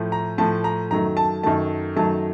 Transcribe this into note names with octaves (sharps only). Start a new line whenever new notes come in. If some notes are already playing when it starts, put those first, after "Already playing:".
Already playing: A2 F3 A3
A#5
A2 F3 A3 A5
A#5
F#2 D#3 F#3 A3 A#5
A5
F#2 D#3 F#3 A3 A5
F#2 D#3 F#3 A3 A5